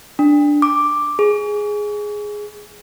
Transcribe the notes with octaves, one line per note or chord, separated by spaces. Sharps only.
D4
D6
G#4